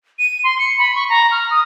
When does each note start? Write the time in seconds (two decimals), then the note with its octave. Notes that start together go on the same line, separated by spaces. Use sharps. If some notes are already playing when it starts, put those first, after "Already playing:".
0.19 D#7
0.44 C6
0.59 C#7
0.78 B5
0.96 C#6
1.10 A#5
1.31 F6
1.51 D#6